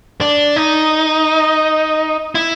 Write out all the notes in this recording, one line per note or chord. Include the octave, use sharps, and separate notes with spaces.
D4
D#4
E4